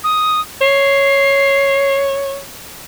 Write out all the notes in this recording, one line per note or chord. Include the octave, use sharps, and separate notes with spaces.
D#6
C#5 C7